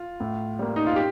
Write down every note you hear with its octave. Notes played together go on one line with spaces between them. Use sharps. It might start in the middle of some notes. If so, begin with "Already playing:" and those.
Already playing: F4
A2
G3 A#3
D#4
F4
G4